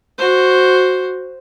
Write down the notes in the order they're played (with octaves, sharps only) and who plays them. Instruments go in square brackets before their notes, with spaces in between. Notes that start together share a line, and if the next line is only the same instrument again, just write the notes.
[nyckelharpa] F#4 C5